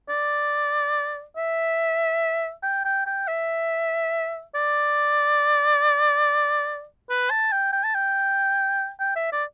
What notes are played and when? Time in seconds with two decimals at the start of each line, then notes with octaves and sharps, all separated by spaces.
0.09 D5
1.37 E5
2.63 G5
2.85 G5
3.06 G5
3.27 E5
4.55 D5
7.10 B4
7.30 A5
7.52 G5
7.73 G5
7.84 A5
7.94 G5
9.00 G5
9.16 E5
9.32 D5